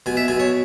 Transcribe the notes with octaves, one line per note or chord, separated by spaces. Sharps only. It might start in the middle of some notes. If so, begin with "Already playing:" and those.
B2 G#5
E5
B2 G#5
C#5